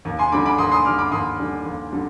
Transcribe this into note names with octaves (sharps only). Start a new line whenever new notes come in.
D#2
G#5 C6
D3 G3 B5 D6
B5 D6
D#2 C6 D#6
C6 D#6
D3 G3 D6 F6
B5 D6
D#2 C6 D#6
D3 G3
D#2
D3 G3